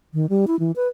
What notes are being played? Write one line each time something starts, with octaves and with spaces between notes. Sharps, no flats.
D#3
G3
E4
E3
B4